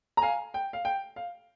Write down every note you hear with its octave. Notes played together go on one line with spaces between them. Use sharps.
A#5
F5 G#5
G5
F5
G5
F5